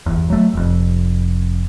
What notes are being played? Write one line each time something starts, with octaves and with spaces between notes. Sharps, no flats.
G1 E2
F#3 A3
F1 F2